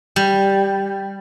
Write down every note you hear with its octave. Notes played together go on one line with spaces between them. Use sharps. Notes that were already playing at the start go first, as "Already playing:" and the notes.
G3